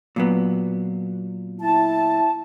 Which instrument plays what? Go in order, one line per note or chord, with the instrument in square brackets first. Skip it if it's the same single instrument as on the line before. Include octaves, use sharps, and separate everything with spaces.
[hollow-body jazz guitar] A#2 F#3 B3
[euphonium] E4 [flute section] A5